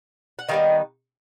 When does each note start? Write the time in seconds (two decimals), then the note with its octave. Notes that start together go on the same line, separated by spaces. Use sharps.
0.39 F#5
0.49 D#3 G3 B3 D#5 F5